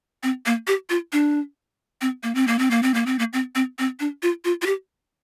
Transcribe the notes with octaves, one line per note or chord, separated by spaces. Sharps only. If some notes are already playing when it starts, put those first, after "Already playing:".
C4
A#3
G4
F4
D4
C4
A#3
C4
A#3
C4
A#3
C4
A#3
C4
A#3
C4
C4
C4
D4
F4
F4
F4
G4